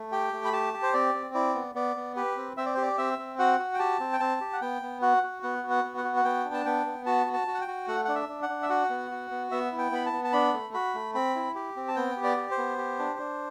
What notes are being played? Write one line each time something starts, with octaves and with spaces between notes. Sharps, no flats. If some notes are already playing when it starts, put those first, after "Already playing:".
Already playing: A3
G4 G5
A3
B5
G4 A5
G4
C5
C4 D5
C4
E4 D5
B3
B3 D5
B3
G4 B4
C4
C4 E5
D5
G4 C5
D5
C4 E5
C4
F#4 F#5
F#4
G5
G4 A5
C4
G5
C4 A5
G4
F#5
B3 G5
B3
F#4 F#5
F#4
B3 F#5
F#4
F#5
B3
F#5
F#4
F#5
B3 G5
D4
A5
B3 G5
B3
F#4 A5
F#4
A5
F#4
F#5
G5
F#4
A3 F#5
D4 F#5
E5
D4
F#5
D4
E5
F#4 F#5
B3
F#4
B3
B3 E5
E4
G5
B3 B5
A5
B3
A5
D4 B5
A3
F#4 B5
A3
C4 B5
E4
G4
C4
A5
B3 G5
G4
D5
G4
C5
B3
G4
D4
D4